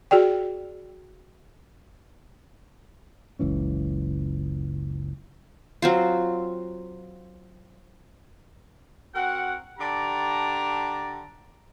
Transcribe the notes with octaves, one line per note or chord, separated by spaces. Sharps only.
F#4 G#4 D5 G5
F#1 C#2 E3 C#4
F#3 C4 F4
C4 F#4 A#4 F#5
D3 G4 D5 A5 A#5